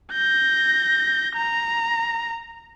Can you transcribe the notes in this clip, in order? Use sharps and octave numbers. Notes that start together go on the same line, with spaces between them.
G6 A#6
A#5